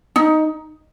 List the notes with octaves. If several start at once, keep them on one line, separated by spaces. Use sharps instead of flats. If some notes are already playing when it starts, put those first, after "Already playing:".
D#4